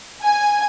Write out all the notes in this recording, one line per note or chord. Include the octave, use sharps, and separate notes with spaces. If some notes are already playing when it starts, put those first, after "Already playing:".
G#5